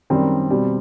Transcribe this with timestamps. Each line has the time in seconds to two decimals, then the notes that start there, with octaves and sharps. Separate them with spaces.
0.10 F#2 D#3 G3 C4
0.50 B2 G3 C4